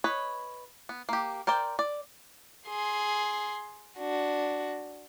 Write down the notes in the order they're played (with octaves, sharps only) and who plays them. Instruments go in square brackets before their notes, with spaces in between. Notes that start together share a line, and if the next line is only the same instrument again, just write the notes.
[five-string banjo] B4 C#5 D#5
B3
A#3 G4
A#4 C5 D5 G5
D5
[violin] G#4 C6
D4 F#4